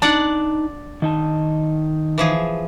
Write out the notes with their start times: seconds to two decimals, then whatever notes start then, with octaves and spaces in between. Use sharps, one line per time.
0.02 D4 D#4 D5 F#5 A5
1.02 D#3 D#4 A5
2.18 E3 F3 G#4